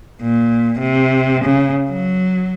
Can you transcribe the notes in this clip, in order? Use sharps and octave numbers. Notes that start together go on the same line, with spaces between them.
A#2
C3
C#3
F#3